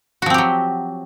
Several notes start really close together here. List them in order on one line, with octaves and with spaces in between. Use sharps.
F#4 F3 C4 G4 F#3